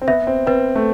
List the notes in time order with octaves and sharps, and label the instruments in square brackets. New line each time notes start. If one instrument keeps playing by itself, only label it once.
[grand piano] C4
[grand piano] B3 [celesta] E5
[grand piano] C4
[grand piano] C4 [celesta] B4
[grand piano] A3